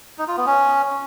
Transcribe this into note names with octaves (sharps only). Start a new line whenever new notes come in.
D#4
F4
B3
C#4